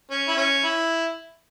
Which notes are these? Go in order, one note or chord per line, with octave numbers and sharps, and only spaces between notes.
C#4
E4
C#4
E4